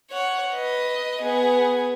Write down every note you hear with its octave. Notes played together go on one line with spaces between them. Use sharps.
C#5 F#5
B4 D#5
B3 G#4